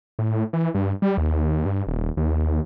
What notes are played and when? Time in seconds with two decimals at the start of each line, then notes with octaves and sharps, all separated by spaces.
0.19 A2
0.53 E3
0.75 G2
1.02 G3
1.17 D#2
1.66 G2
1.87 D#1
2.17 D#2